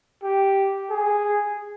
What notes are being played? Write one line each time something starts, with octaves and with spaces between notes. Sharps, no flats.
G4
G#4